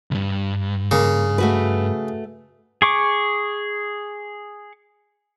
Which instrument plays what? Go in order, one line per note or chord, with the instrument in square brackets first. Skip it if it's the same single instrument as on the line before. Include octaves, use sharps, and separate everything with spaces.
[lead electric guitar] C2 G2
[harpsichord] C#3 [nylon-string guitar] A#3
[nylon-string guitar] A3 F#4 B4
[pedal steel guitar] G#4 C#6 D6